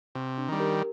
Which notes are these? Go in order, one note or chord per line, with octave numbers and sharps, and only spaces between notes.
C3 C4
D4
D#3 G3
G4 A#4